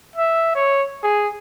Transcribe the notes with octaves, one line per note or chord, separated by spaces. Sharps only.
E5
C#5
G#4